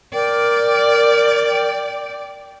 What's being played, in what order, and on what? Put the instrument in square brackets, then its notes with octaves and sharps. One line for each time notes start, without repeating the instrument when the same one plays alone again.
[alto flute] A#4 [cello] D5 [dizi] G5